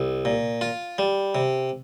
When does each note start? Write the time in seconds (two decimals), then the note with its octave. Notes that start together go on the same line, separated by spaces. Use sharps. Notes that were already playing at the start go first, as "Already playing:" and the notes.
Already playing: C2
0.25 A#2
0.61 F4
0.98 G3
1.35 C3